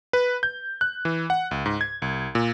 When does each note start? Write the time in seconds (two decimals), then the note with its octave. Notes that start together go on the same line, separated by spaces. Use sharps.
0.13 B4
0.43 G6
0.81 F#6
1.05 E3
1.30 F#5
1.51 C#2
1.66 G#2
1.81 G#6
2.02 C2
2.35 A#2